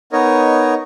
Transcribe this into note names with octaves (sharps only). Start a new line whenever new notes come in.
B3 D#4 A#4 C#5 D#5